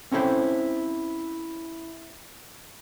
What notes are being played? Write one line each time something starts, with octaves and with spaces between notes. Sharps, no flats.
C4 C#4 E4 A4 C5 G5